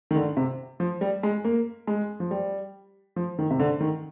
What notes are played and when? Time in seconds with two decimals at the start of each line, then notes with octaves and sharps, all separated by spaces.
0.11 D#3
0.16 D3
0.37 C3
0.80 F3
1.01 G3
1.23 G#3
1.45 A#3
1.87 G#3
2.20 F3
2.31 G3
3.16 F3
3.39 D#3
3.51 C3
3.59 D3
3.80 D#3